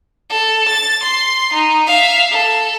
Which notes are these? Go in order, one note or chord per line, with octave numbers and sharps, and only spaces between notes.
A4
A6
C6
D#4
E5 F5
A4